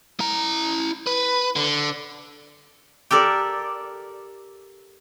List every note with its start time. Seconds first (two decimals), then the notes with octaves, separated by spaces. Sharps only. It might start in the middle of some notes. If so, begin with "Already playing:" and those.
0.20 E4 A#5
1.07 B4
1.56 D3
3.11 G4 A4 A#4 D5